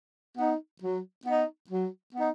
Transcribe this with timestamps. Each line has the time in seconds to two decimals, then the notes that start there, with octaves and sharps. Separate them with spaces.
0.38 B3 D#4
0.82 F#3
1.26 B3 D#4
1.70 F#3
2.15 B3 D#4